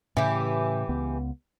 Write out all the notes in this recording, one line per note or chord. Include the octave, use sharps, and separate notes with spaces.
A2 C#3 E3 G4
C#2 B3